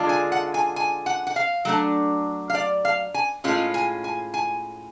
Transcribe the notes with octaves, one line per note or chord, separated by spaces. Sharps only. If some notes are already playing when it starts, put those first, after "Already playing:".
Already playing: D3 G#3 D4 F4
G#5
F#5
G#5
G#5
F#5
F#5
F5
F#3 A3 D4
F5
D5
F5
G#5
A2 G#3 C#4 F4
G#5
G#5
G#5